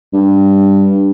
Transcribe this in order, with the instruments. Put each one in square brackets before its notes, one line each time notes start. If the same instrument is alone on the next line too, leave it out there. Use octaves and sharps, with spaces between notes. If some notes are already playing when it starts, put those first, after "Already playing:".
[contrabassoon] G2